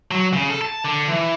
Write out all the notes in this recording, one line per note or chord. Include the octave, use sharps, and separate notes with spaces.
F#3
C#3
A4
A5
D3
E3